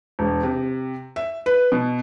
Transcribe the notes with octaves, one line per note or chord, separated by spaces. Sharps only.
E1
C3
E5
B4
B2